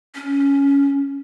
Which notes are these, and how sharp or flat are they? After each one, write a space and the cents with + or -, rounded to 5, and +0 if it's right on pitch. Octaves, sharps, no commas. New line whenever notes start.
C#4 +10